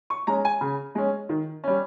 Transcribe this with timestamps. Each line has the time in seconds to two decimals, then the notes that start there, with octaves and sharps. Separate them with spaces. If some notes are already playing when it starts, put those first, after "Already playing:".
0.10 C#6
0.27 G#3 C#4 A#5
0.45 G#5
0.61 C#3
0.95 G#3 C#4
1.29 D#3
1.64 G3 C#4